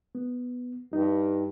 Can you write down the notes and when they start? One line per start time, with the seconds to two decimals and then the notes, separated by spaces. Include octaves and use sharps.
0.15 B3
0.93 G2 D#4